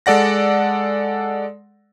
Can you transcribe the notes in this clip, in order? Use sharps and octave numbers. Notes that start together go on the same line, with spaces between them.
G#3 A4 D5 F#5 A#6